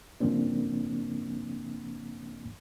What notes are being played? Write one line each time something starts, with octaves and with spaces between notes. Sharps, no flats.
G2 C#3 F3 A#3 C4 D4